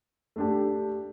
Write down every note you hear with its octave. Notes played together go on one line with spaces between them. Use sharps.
A3 D4 G4